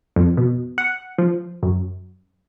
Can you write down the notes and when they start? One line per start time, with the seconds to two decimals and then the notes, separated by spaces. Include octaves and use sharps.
0.16 F2
0.37 B2
0.78 F#5
1.18 F3
1.63 F#2